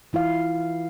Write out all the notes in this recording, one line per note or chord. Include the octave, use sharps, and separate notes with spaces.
E3 E4 F4 F5